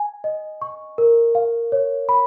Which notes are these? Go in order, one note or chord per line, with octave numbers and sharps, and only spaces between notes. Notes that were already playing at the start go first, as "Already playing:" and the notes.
Already playing: G#5
D#5
C#6
A#4
F5
C#5
B5